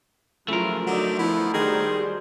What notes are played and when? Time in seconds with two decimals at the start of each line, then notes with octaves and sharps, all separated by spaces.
0.48 C#3 F3 F#3 A3 E4 F4 A#4
0.87 D3 F#3 D#4 D5 E5
1.19 F3 B3 E4
1.54 D#3 G3 F#4 G#4 C5